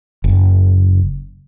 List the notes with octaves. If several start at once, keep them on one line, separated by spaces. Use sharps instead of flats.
F#1